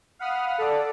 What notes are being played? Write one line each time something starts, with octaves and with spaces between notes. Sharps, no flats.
F5 F#5 B5 D#6 F6
A4 D5